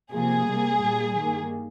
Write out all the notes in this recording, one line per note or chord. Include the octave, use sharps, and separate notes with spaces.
C3 F3 A#3 G#4
C3 G3 A#3
A#2 G3 A#3
G2 D#3 A#3